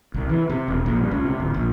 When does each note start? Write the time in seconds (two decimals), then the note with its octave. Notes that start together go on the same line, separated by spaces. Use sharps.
0.14 C2
0.29 E3
0.49 C3
0.68 E1
0.86 A#1
0.99 G2
1.11 C#2
1.24 C3
1.40 D1
1.54 A#1